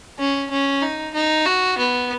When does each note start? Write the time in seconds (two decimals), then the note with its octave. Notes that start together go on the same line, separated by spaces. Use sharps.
0.19 C#4
0.51 C#4
0.82 D#4
1.14 D#4
1.46 F#4
1.78 B3